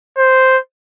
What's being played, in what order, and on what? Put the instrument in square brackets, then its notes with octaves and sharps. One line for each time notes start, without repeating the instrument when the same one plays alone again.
[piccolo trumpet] C5